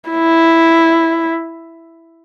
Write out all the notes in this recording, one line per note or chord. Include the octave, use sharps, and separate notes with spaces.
E4